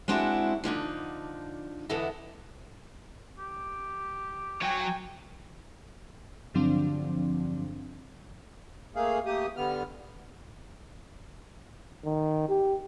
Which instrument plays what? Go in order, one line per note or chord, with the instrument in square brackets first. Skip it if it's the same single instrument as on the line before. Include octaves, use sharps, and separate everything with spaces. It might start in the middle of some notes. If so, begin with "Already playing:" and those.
[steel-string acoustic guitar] G#3 C4 D4 E4 F#4
D3 F3 D4 D#4
E2 D3 B3 E4 A4 D#5
[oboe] G4
[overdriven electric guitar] F#3 C#5 [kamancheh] G5 [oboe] G#5
[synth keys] G2 D3 F3 F#3 C4 D4
[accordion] A3 A#3 G#4 F5
A3 A#3 G4 D#6
D3 G3 B3 F6
[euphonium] D#3
G4